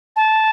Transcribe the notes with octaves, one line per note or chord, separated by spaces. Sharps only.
A5